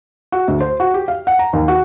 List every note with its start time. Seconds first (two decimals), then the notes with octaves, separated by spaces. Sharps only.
0.32 F#4
0.48 D2
0.61 C5
0.80 F#4
0.94 G4
1.08 F5
1.27 F#5
1.39 A#5
1.53 D#2
1.68 F#4